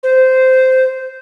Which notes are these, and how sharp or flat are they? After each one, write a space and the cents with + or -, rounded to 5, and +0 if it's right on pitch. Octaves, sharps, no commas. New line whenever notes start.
C5 -10